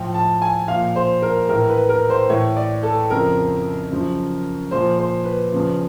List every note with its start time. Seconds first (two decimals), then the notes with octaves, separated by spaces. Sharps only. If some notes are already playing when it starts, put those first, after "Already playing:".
Already playing: A2 F3 G5
0.14 A5
0.42 G#5
0.68 A#2 F3 F5
0.96 C5
1.22 A#4
1.49 A2 E3 A#4
1.70 B4
1.89 A#4
2.10 C5
2.30 A2 E3 C#5
2.57 D5
2.83 A4
3.10 F2 C#3 F3 A#4
3.91 F#2 C#3 F3
4.71 A#2 F3 C5
4.99 C5
5.25 B4
5.52 E2 C#3 F3